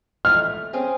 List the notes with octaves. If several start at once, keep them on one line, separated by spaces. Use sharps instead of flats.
A3 F6
C4 C#4 G#4